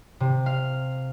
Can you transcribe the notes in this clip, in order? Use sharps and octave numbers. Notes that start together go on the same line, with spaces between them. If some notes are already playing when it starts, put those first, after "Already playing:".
C3
F5